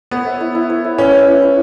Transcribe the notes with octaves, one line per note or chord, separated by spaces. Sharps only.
B3 C#5
E5
E4
E4
C#5
E5
C#4 B4
E5
E4
E4